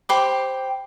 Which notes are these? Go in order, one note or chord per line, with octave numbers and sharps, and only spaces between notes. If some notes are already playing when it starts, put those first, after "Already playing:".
G4 C5 B5 D6